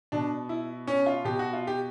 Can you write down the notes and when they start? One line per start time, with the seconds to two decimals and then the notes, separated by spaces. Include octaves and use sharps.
0.12 B2 D4
0.49 E4
0.87 C#4
1.06 F4
1.25 B2 G4
1.39 F#4
1.53 F4
1.67 G4